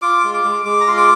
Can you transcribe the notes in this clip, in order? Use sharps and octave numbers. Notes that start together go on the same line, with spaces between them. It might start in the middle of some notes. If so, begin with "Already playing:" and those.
F4 D6
G#3
D6
G#3
G#3 D6
A#5
F4 C6
D6